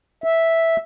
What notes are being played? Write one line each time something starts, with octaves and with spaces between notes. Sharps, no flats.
E5